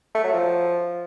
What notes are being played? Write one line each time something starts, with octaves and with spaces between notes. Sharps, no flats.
A3
F#3
F3